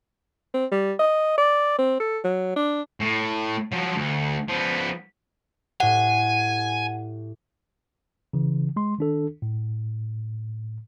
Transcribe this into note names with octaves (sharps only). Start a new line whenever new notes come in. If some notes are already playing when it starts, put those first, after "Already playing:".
C4
G3
D#5
D5
C4
A4
F#3
D4
A2
F3 F#3
D2
F3 B3
A2 G4 F#5 G#5
C#3 E3
G#3 C6
D#3 D4 A4
A2